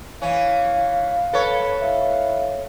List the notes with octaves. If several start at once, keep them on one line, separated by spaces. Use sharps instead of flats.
E3 C#4 F5
A4 B4 C#5
E4 F5